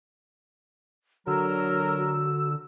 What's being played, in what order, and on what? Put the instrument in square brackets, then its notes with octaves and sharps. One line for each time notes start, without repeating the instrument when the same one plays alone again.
[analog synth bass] D3 [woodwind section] F#3 A#4 [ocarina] F#4 [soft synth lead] E6